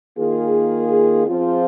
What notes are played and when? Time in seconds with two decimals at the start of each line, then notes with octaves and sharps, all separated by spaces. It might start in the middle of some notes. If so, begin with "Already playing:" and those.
0.17 D#3 A#3 F4 G#4
1.27 F3 C4 F4 G#4 C5